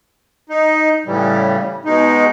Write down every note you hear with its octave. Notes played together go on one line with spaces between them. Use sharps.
D#4
A2 C#3 E3 G3
B2 G#3 D#4